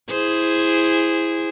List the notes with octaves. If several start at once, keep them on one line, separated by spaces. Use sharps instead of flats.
E4 G#4 C5